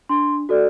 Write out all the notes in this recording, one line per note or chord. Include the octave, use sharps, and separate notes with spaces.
D4 C6
F#4 A4 D5